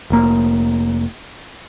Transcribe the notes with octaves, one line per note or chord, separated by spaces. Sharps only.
F1 A#3